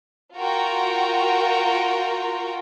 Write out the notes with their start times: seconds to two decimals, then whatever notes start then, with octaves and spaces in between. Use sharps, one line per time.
0.35 F4 F#4 A#4 G5 A#5